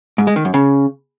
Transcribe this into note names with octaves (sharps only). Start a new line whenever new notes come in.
G#2
G#3
D#3
F#2
C#3